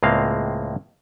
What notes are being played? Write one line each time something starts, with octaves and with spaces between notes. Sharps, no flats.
C#2 A2 G#3 A#3 C4 F5